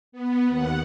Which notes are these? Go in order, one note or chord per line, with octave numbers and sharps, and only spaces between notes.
B3
D#2 F#5